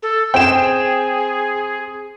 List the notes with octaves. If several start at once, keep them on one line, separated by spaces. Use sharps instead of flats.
A4
C4 G#4 G5 E7